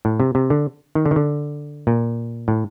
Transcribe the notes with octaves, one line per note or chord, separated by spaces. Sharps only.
A2
C3
C3
D3
D#3
D3
D#3
D3
A#2
A2